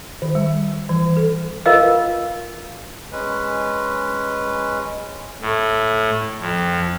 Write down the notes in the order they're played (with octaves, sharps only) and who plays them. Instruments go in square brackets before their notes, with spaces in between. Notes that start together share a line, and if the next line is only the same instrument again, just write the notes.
[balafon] D#3
G3
E3
A4
[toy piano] F4 A#4 B4 D#5 F5 E6
[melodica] G#3 C#4 B4
[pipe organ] A2
F2